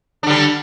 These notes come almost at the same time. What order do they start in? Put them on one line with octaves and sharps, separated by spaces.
D4 D3 G3